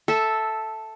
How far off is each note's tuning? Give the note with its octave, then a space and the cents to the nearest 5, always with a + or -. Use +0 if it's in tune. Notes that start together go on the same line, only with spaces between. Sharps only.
A4 +0 E5 -10